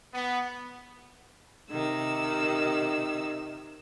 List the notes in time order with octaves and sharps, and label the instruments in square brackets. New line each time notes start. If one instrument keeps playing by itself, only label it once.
[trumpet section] B3
[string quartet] C3 D#3 E6